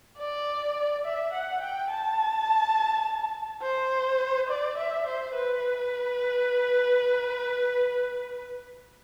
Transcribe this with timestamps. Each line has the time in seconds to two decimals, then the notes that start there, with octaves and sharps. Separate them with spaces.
0.18 D5
1.04 E5
1.33 F#5
1.61 G5
1.91 A5
3.62 C5
4.49 D5
4.78 E5
5.07 C5
5.35 B4